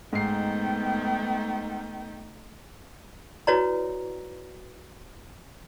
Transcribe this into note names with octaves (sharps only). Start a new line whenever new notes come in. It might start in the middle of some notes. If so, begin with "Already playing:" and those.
G#2 A3 B3 D#4 G5 C7
E4 F#4 B4 C#5 D5 A#5